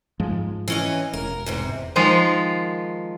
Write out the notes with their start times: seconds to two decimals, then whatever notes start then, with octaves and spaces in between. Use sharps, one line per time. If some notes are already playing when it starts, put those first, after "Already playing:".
0.20 G#2 F3 G#3
0.68 E3 C#4 D#5
1.13 E1 A#4
1.46 E2 G#2 C3
1.96 D#3 F3 G#3 F4